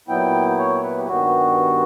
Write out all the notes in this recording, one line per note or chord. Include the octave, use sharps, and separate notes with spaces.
A#2 F#3 B3 E4 G5
C#5
B4
G4
G2 D#3 G3 B3 F#4